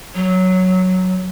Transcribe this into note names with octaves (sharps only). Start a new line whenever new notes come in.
F#3